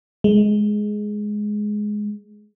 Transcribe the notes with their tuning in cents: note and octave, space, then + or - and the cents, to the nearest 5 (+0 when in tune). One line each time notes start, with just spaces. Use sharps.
G#3 +10